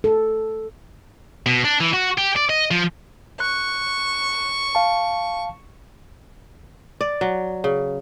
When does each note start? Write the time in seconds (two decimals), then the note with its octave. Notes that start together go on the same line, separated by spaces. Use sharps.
0.04 A4
1.46 B2
1.65 D4
1.80 E3
1.93 F#4
2.18 G4
2.36 D5
2.50 D#5
2.71 F3
3.40 C#6 F#6
4.75 F5 A5
7.01 D5
7.21 F#3
7.64 C#3